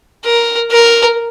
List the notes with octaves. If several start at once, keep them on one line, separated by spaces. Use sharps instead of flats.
A#4
A#4